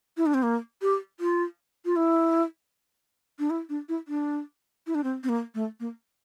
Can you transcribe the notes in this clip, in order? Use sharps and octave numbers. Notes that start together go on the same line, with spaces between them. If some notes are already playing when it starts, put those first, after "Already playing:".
E4
D4
C4
A#3
G4
F4
F4
E4
D4
E4
D4
E4
D4
E4
D4
C4
C4
A#3
A3
A#3